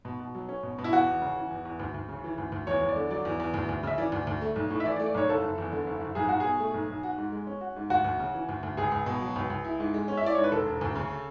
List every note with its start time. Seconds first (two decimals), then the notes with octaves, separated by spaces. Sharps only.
0.05 B2
0.20 B2
0.35 F#3
0.49 C#4
0.63 B2
0.78 B2
0.84 E4
0.92 E2 F#4
1.07 E2
1.22 C#3
1.36 E3
1.51 E2
1.65 E2
1.80 D2
1.94 D2
2.08 C#3
2.24 E3
2.38 D2
2.52 D2
2.67 E2 C#5
2.81 E2
2.89 D5
2.96 D3
3.10 F#3 D5
3.25 E2
3.40 E2
3.54 D2
3.69 D2
3.83 C#3 E5
3.98 E3 D5
4.12 D2
4.27 D2
4.41 A3
4.56 B1
4.70 A2
4.80 E5
4.85 E3 D5
4.96 D5
5.00 A3
5.06 D5
5.14 B1 C#5
5.28 F#1 A4
5.43 F#1
5.58 E2
5.72 D3
5.87 F#1
6.01 F#1
6.15 B1 G#4
6.29 B1 F#4
6.40 B2 G#4
6.60 A3
6.74 B1
6.89 B1
7.03 F#4
7.18 G#2
7.32 G#3
7.47 C#4
7.61 F#4
7.76 G#2
7.90 D2 F#4
8.04 D2
8.19 C#3
8.34 E3
8.49 D2
8.63 D2
8.77 C#2 G#4
8.92 C#2
9.06 B2
9.22 F#3
9.36 C#2
9.50 C#2
9.64 E4
9.80 G#2
9.94 G#3
10.08 C#4
10.17 E5
10.23 E4 D5
10.35 G#2 C#5
10.44 B4
10.52 E1 A4
10.66 E1
10.81 D2
10.95 C#3